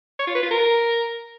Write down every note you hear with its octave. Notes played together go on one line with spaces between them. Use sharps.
C#5
F4
B4
F4
A#4